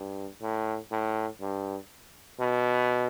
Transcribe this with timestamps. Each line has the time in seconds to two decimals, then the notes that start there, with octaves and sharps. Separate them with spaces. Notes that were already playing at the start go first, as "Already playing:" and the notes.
Already playing: G2
0.42 A2
0.92 A2
1.41 G2
2.40 B2